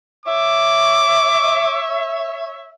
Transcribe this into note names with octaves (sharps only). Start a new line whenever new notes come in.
C#5 E5 D6